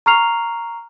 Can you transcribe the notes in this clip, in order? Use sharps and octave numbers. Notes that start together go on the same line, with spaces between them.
A#5 C#6 F6 C7 F7